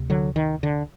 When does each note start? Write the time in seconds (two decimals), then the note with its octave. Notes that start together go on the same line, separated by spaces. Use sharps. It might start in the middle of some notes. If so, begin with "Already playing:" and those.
Already playing: D2 C3
0.10 D3 F#3
0.36 D#3
0.63 D3